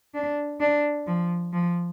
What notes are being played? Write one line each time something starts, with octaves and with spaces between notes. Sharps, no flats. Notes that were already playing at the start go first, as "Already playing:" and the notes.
D4
D4
F3
F3